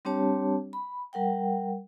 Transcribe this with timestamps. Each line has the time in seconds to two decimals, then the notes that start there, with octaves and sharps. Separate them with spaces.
0.05 G3 C4 D4 G4 C#5 A5
0.73 B5
1.13 G3 A#4 F#5 G5